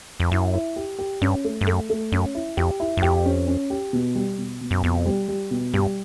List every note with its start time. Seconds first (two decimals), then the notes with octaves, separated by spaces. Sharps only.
0.20 F2
0.31 F#2 E4
0.54 E4
0.76 G4
0.99 G4
1.21 G2 C#4
1.44 A3
1.61 G2
1.67 F#2 A3
1.90 A3
2.12 F#2 C#4
2.35 E4
2.57 F2 G4
2.80 E4
2.97 F#2
3.02 F2 G4
3.26 C#4
3.47 C#4
3.70 G4
3.93 B2
4.15 G3
4.38 B2
4.61 B2
4.71 F#2
4.83 F2 B2
5.06 G3
5.28 G3
5.51 B2
5.73 G2 G3